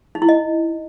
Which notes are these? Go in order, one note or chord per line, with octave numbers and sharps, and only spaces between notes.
D#4
E4
D#5